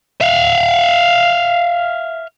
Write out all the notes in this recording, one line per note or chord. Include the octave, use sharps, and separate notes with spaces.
E5 F5